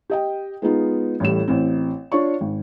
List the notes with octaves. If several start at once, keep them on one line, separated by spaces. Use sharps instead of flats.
G4 D#5 G5
G#3 B3 D#4 F4
A1 A2 G3 E7
A1 C4
D4 F4 C#5 D5 C#6
G#1